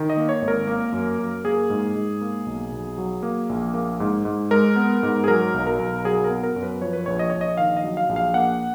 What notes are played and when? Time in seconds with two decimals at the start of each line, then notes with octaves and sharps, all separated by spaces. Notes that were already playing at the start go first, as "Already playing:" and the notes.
Already playing: D#3
0.10 D#5
0.17 A#3
0.29 C#5
0.42 G#1
0.48 A#4
0.67 A#3
0.92 F#2
1.19 F#2
1.45 A#3 G#4
1.70 G#2
1.95 G#2
2.21 A#3
2.46 B1
2.72 B1
2.98 F#3
3.23 A#3
3.49 A#1
3.74 A#3
4.00 G#2
4.25 G#2
4.51 G#3 A#4
4.76 B3
5.03 G#2
5.24 G#4
5.28 F#3 A#4
5.54 B1
5.67 A#4
5.79 B1
6.04 F#3 G#4
6.24 A#4
6.30 B3
6.44 A#4
6.56 F#2
6.63 B4
6.81 F3 C#5
6.93 B4
7.06 A#1 C#5
7.19 D#5
7.30 A#1 C#5
7.41 D#5
7.57 D#3 F5
7.77 D#5
7.84 F#3
7.97 F5
8.09 A#1
8.16 F5
8.34 A#3 F#5